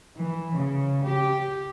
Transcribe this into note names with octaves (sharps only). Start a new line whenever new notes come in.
E3
C#3
G4